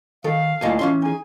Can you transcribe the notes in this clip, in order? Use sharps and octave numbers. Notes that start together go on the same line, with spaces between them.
D#3 A4 F5
D2 A#2 E4 D#5 G#5 A5
E3 C#4 C6
D#4 G#4 G#5